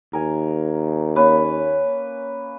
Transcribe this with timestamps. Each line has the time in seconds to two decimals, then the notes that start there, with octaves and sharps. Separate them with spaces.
0.13 D#2 A#4 G#5
1.16 A#3 C#4 B4